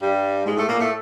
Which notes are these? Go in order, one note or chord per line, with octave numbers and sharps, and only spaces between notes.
G2 G3
G#2 G#3
A2 A3
A#2 A#3
A2 A3